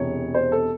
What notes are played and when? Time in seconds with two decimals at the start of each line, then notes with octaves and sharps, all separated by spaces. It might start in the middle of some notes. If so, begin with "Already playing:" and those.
Already playing: E1 E2 C3 C#5
0.34 C5
0.52 A4